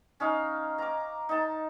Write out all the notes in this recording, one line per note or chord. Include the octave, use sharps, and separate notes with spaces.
C#4 D#4 F5
A#5 D6
D#4 A5